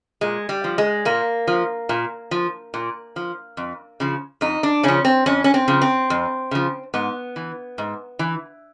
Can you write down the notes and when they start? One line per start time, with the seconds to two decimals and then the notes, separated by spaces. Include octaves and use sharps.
0.21 A#2 G#3
0.49 G3
0.64 F3
0.78 G#3
1.05 A#2 A#3
1.47 F3
1.89 A#2
2.31 F3
2.74 A#2
3.16 F3
3.57 F2
4.00 C#3 F3
4.41 F2 D#4
4.63 D4
4.83 C#3 F3 C#4
5.05 C4
5.26 F2 C#4
5.44 C#4
5.54 C4
5.68 C#3 F3
5.82 C4
6.10 F2
6.51 C#3 F3
6.94 G#2 B3
7.36 E3
7.78 G#2
8.19 E3